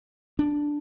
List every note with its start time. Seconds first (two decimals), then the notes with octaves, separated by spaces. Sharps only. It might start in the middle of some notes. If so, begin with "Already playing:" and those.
0.39 D4